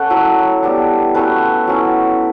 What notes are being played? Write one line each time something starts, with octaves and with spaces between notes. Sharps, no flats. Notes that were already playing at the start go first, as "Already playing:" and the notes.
Already playing: C#4 A4 F#5
F#3 A3 E4
G3 B3 D4
F#3 A3 C#4 E4 B4
F#3 C#4 E4